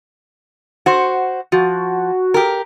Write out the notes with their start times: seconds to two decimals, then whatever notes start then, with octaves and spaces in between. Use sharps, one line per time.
0.86 F#4 C5
1.52 F3 F#4
2.34 G4 A#4